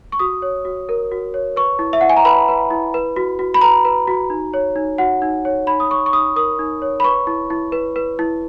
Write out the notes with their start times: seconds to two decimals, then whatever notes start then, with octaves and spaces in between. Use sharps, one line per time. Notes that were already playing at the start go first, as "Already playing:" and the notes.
0.12 C#6
0.19 F#4 D#6
0.42 C#5
0.65 F#4
0.89 A#4
1.12 F#4
1.34 C#5
1.56 B4 C#6
1.79 E4
1.93 E5
2.01 E4 F#5
2.10 G#5
2.17 A#5
2.25 B4 B5
2.48 B4
2.70 E4
2.94 B4
3.16 F#4
3.39 F#4
3.54 B5
3.61 B4 A#5
3.85 B4
4.07 F#4
4.30 D#4
4.54 C#5
4.76 D#4
4.98 F#4 F#5
5.22 D#4
5.45 C#5
5.67 D#4 B5
5.80 D#6
5.91 C#5 C#6
6.06 C#6
6.13 D#4 D#6
6.36 A#4 D#6
6.59 D#4
6.82 C#5
7.00 B5
7.04 B4 C#6
7.27 E4
7.50 E4
7.72 B4
7.96 B4
8.19 E4